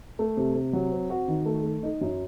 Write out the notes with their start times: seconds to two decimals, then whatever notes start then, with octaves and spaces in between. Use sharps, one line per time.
0.19 A3
0.37 C3
0.55 C3
0.73 F#3
0.92 C4
1.10 F#4
1.28 D#3
1.46 A3
1.64 A3
1.83 D#4
2.01 F#2